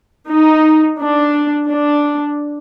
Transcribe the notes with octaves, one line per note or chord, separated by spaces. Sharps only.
D#4
D4
D4